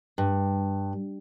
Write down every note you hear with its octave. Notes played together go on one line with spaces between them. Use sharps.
G2